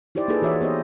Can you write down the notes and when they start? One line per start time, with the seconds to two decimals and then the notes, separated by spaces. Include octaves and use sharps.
0.15 D#4 E4 G4 C5 D5
0.28 A#3 D#4 F4 G#4 A4 B4
0.42 E3 F#4 C#5 E5
0.61 B3 G4 C5 D#5